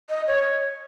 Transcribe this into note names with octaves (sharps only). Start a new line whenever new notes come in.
D#5
C#5